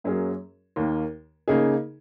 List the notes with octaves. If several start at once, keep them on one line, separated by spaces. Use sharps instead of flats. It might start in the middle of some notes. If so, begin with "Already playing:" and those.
F#2 F#3 A#3 C#4 G#4
D#2 D#3 A#3
C#3 A#3 D#4 G#4